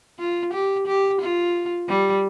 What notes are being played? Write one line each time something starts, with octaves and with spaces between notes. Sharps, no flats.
F4
G4
G4
F4
G3